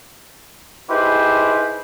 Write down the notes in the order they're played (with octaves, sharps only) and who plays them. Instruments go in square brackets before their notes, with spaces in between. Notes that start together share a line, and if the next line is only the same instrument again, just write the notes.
[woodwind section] D#4 E4 G4 G#4 B4 C5